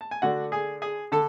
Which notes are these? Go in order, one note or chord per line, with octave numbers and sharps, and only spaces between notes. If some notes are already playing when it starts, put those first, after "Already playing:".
A5
G#5
D3 A3 D4 F#4 F#5
G#4 G#5
G#4 G#5
D3 A4 A5